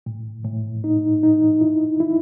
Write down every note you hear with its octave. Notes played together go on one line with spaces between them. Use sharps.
A2
A2
D#4
D#4
E4
E4